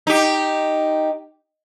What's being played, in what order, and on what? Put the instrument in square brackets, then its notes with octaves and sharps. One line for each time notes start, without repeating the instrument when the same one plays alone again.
[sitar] D#4 G4